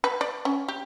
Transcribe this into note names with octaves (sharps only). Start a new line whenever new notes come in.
B4
D5
C#4
G4